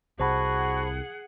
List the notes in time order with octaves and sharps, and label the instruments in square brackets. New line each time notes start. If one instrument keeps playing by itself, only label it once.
[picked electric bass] C2 [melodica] F#4 [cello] G#4 F#5 [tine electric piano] C5 A5 B5